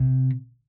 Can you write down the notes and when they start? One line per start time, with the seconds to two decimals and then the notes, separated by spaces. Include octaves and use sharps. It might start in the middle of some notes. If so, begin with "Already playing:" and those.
Already playing: C3